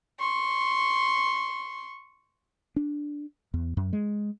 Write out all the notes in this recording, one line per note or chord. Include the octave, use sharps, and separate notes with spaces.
C6 C#6
D4
E2
F#2
G#3